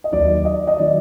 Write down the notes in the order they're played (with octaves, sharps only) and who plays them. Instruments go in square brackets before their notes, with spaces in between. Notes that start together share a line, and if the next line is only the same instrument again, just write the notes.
[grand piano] D#5
D#2 D#3 F#3 D5
D#5
D#5
D#3 F#3 D5